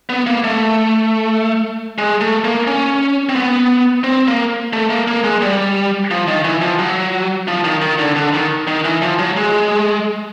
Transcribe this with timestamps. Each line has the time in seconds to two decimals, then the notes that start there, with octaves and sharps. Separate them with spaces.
0.09 B3
0.27 A#3
0.44 A3
1.98 G#3
2.21 A3
2.44 A#3
2.67 C#4
3.29 C4
3.36 B3
4.04 C4
4.28 A#3
4.73 A3
4.90 A#3
5.08 A#3
5.24 G#3
5.42 G3
6.11 F3
6.28 D#3
6.44 E3
6.62 F3
6.79 F#3
7.48 F3
7.64 D#3
7.82 D#3
7.99 D3
8.16 D3
8.34 D#3
8.67 D#3
8.85 E3
9.02 F3
9.19 F#3
9.37 G#3